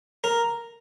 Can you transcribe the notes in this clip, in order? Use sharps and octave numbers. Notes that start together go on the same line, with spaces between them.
A#4